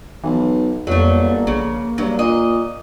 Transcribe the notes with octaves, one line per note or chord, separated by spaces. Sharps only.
B1 E3
G1 F2 F#3 A3 A#3
A#1 C#3
G2 F#3
A#2 D#5